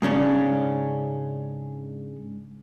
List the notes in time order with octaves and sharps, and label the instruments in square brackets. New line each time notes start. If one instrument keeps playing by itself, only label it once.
[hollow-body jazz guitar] G#2 C#3 C#4 D4